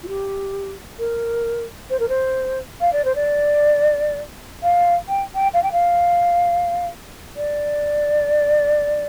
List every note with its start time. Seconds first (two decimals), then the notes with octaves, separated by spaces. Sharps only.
0.03 F4
0.08 G4
0.99 A#4
1.90 C5
1.99 A#4
2.09 C5
2.81 F5
2.93 D5
3.05 C5
3.15 D5
4.63 F5
5.08 G5
5.35 G5
5.54 F5
5.63 G5
5.72 F5
7.36 D5